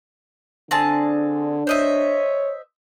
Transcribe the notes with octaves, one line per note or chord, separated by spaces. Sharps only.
D3 C4 D4 G#4 A5
C5 C#5 D#5 E5